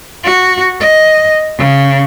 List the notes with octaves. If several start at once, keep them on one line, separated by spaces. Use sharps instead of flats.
F#4
D#5
C#3